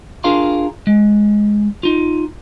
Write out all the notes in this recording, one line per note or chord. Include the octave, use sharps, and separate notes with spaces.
D4 F4 G#4 A#4 F5 C6
G#3
D#4 F4